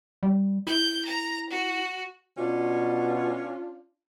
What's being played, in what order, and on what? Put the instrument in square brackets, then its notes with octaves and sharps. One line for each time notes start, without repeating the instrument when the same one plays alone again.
[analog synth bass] G3
[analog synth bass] E4 [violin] G6
[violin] A#5
F#4
[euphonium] B2 [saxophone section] C#4 D4 F4